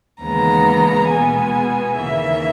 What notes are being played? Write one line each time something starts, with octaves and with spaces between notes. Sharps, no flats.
D#2 C#3 E3 G#3 B3 A#5
B2 G#3 B3 G#5
D#2 C#3 E3 A#3 E5